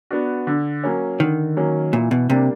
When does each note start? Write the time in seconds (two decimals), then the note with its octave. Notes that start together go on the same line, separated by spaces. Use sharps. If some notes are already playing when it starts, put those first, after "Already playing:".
0.11 B3 D4 F#4
0.47 D3
0.84 F#3 A#3 C#4
1.20 D3 D#3
1.57 F#3 A#3 C#4
1.93 A#2 E3
2.11 B2
2.30 C3 G3 A#3 D4